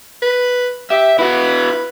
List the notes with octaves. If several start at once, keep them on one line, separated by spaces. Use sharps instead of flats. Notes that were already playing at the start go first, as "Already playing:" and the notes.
B4
G4 E5
E4 F#4 B4